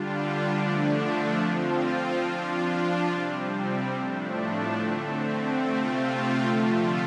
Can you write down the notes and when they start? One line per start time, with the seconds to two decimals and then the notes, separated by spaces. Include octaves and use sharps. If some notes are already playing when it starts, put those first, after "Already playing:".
Already playing: D3 G3 D4 F4
0.52 D3 F3 A3 D4
1.37 F3 C4 F4
2.23 F3 D4 F4
3.08 C3 G3 C4
3.92 A2 F3 A3 D4
4.78 D3 A3 C4
5.63 C3 A3 C4 F4
6.48 D3 F3 A3 F4